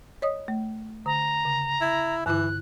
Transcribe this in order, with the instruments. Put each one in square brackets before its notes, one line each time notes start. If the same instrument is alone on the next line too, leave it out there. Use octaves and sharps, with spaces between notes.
[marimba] C#5 D#5 D#6
A3
[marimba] D3 [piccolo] A#5
[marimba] C#3
[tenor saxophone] E4
[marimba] G2 D3 E4 [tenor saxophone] E3 [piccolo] F#6